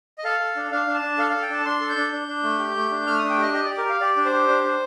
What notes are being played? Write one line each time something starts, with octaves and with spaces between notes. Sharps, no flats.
D#5
A4 F5
A4
D4
D4 F5
D4
A5
D4
A4 F5
A4 F5
G5
D4 A5
D4 C6
A4
G6
D4
D4
D4
A3
G4
A3
D4
A3 F6
D4 D#6
G5
G4 D#5
G4 D#5
G4 D5
A#4
G4 F5
G4 D5
D4
C5
G4
D4
D4